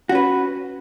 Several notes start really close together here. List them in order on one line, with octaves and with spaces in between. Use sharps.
F#4 C#4 B4